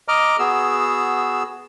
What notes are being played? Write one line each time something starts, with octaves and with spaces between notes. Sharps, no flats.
D#5 A#5 D6 F6
B3 F#4 G#4 E6